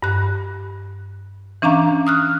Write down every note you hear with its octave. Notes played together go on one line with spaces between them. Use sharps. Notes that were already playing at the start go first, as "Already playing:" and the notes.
G2 F#6
E3 C#4 D4 F5 A#5
D#6 F6 F#6